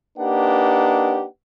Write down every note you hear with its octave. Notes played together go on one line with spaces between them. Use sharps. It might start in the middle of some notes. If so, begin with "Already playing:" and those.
A#3 D4 D#4 G4 B4 F#5